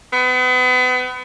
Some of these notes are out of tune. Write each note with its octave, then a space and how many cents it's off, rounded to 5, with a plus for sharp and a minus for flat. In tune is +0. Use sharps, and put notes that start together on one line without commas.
B3 +35